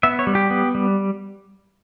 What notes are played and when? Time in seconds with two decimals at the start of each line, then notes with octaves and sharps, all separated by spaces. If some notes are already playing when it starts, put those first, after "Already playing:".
0.03 B3 E5
0.19 C#5
0.27 G3
0.35 G4
0.50 B3
0.75 G3